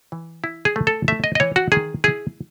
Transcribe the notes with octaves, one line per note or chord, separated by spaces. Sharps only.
E3
E4
G#4
A3
A4
A3 E5
D#5
D#5
E3 C#5
F#4
D#3 G#4
E4 G#4